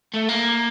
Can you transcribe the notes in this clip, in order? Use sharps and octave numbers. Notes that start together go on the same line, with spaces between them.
A3
A#3